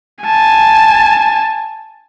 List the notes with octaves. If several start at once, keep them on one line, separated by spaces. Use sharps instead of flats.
G#5 A5